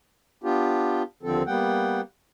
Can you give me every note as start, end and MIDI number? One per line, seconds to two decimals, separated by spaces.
0.44 1.03 59
0.44 1.03 62
0.44 1.03 65
0.44 1.03 67
1.23 1.43 39
1.23 1.43 50
1.23 1.43 53
1.23 1.43 60
1.23 1.43 69
1.47 2.01 55
1.47 2.01 58
1.47 2.01 59
1.47 2.01 78
1.47 2.01 79